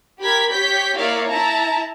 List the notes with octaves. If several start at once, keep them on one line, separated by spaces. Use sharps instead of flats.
G4 A#4 B5 G#6 B6
G4 C#5 G6 B6
A#3 E4 C#5 D5 F5
E4 A5 A#5